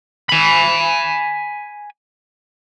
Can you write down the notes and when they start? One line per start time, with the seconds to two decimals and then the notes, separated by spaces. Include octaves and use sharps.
0.29 G#5 B5